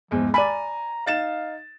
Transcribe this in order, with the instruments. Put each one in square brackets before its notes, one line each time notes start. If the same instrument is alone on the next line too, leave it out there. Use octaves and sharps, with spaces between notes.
[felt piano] E2 G#2 [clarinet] F3
[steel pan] D5 B5 [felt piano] G#5 D#7 [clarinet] A#5
[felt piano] D#4 A6 E7 [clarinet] F5